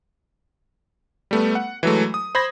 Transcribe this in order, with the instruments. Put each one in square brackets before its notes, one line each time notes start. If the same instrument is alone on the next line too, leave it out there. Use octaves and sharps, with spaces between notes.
[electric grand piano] G3 A3 B3
F#5
E3 F#3 G#3 A3
D#6
C5 B5 G#6 A#6